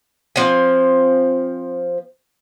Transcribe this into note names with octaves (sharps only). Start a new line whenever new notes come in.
F3 C4 C5 G#5